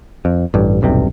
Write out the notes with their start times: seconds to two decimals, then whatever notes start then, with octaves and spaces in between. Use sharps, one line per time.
0.25 F2
0.54 A1 G2
0.82 D#1 B1 G2 C3